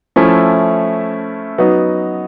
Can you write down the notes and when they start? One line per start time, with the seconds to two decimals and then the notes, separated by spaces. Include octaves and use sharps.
0.16 F3 A3 C#4 E4
1.58 F#3 B3 D#4